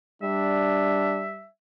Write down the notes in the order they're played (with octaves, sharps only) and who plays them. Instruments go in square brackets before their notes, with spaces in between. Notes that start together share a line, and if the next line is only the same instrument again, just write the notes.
[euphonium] G3 [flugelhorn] D4 [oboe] E5